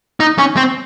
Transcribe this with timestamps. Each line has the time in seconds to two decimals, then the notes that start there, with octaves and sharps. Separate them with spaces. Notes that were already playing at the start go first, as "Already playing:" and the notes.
0.20 D#4
0.38 C#4
0.57 C4